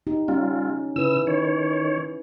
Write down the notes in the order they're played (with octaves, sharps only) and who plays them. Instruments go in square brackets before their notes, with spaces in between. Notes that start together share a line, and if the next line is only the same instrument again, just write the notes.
[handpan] D#4 G4
[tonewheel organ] G3 F4 [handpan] C#4
[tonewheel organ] C#3 E6 [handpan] E4 B4
[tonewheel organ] D#3 C#5